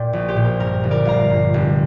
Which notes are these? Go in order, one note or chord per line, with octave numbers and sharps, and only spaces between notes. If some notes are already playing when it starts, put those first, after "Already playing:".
Already playing: A#2 D5 G5
A#1
G4 C5
A#2
A#4
G2 A#4
G1
A#4 D5
G1 F5 A#5
G2
F1